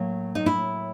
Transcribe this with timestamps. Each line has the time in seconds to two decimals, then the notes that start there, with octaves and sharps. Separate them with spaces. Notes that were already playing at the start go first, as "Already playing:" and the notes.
Already playing: A2 F#3 A#3
0.35 D#4
0.46 E4